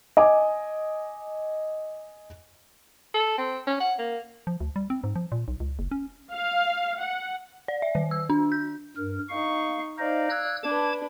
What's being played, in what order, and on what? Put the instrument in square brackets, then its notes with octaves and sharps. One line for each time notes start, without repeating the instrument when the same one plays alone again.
[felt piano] D#5 G#5 D6
[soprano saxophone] A4
C4
C#4
F#5
A#3
[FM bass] F3
D2
G3
C4
G#2
F3
A#2
B1
C#2
F#1
C#4
[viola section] F5
F#5
[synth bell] D5
E5
D#3
E6
D4
G6
[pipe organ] G2 A#4
[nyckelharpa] D#4 C#6 [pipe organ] F5
[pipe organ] D#4 C5 D#5 [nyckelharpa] D5 F5
[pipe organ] E6 F#6 G#6
[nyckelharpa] D4 B4 [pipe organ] A5 D6 G#6